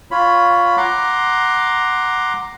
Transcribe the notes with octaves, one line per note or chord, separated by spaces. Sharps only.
F4 C#5 B5
F#5 A#5 C6 D6